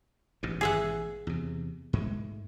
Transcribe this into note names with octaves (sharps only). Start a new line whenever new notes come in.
A1 G#2 B2
G#4 E5 F#5
E2 C3
G#2 G#3 A3